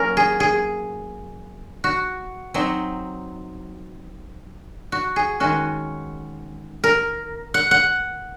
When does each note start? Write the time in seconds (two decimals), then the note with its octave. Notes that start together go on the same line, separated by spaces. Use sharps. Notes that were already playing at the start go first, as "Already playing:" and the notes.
Already playing: F#3 A#3 C#4 A#4
0.17 G#4
0.40 G#4
1.84 F#4
2.54 F#3 C4 D#4
4.92 F#4
5.16 G#4
5.40 D#3 G#3 C#4 F#4
6.84 A#4
7.54 F#5
7.71 F#5